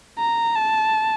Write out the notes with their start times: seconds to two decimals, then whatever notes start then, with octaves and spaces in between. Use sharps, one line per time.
0.19 A#5
0.55 A5